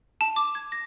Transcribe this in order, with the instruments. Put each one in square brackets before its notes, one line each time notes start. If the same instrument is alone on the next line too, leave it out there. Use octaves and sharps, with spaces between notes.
[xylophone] A5
D6
G#6
A#6